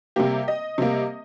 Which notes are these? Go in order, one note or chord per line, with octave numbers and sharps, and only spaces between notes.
C3 G3 A#3 G4
D#5
C3 G3 A#3